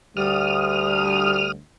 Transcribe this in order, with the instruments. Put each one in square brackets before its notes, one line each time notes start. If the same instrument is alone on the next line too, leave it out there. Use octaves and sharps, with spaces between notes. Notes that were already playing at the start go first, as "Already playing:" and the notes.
[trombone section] D2 [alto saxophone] G3 [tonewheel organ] D#6 F6